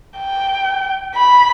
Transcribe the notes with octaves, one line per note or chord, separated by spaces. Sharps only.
G5
B5